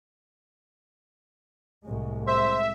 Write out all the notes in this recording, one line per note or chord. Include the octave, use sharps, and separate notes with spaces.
C2 A2 G#3
C5 E5